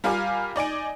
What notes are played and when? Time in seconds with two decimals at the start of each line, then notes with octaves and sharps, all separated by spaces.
0.04 G3 F4 A#4 F5 G#5 D6
0.56 D#4 D5 G#5 D7